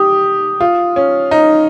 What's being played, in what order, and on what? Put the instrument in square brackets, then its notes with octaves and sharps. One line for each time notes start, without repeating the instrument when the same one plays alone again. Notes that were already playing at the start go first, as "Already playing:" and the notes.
Already playing: [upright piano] G4 [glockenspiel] D#6
[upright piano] F4
C#4
D#4